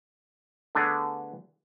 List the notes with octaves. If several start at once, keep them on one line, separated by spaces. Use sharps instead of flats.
D3 A3 B3 G#4 D5 A#5